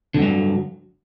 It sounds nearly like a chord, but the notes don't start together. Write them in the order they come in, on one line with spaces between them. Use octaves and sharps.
D3 E2 G2 F#3